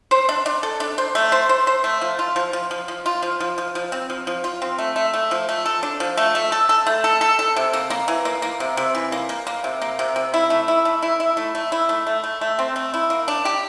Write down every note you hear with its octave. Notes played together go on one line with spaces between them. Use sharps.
C5
D4
D4
A4
D4
C5
A3
C5
C5
C5
A3
F3
F4
F3
F3
F3
F3
F4
F3
F3
F3
F3
C4
F3
F3
F4
C4
A3
A3
A3
F3
A3
A4
D4
F3
A3
A3
A4
A4
A3
A4
A4
A4
C3
A#3
A#3
E3
A#3
A#3
C3
C3
E3
A#3
A#3
A#3
C3
A#3
C3
C3
E4
A3
E4
A3
E4
E4
A3
A3
E4
A3
A3
A3
A3
C4
A3
E4
A#3
D4
G4